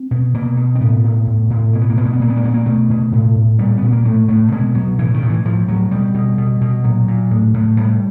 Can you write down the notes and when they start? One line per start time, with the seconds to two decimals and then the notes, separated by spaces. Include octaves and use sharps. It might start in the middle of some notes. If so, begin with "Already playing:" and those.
Already playing: C4
0.11 B2
0.34 B2 A#3
0.57 B2
0.75 C4
0.80 A2 B3
1.04 A2
1.27 A2
1.50 A2
1.73 B2 A#3
1.82 B3
1.90 A#3
1.97 B2 B3
2.05 A#3
2.13 B3
2.20 A#2 A#3
2.29 B3
2.37 A#3
2.43 A#2 B3
2.54 A#3
2.66 B2 A3
2.90 B2
3.12 A2
3.36 A2
3.59 A#2 G3
3.78 A#2 B3
3.92 A#3
4.05 A2 A3
4.28 A2 A3
4.52 B2 G#3
4.75 B2 F#3
4.99 A2 E3
5.14 D#3
5.22 A2
5.30 E3
5.45 A2 F3
5.68 A2 F#3
5.91 B2 G3
6.14 B2
6.38 B2
6.61 B2
6.84 A#2 F#3
7.08 A#2
7.31 A2
7.54 A2
7.77 A2 G3